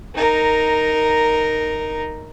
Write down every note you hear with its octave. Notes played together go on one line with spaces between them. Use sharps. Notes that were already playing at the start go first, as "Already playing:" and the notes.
D#4 A#4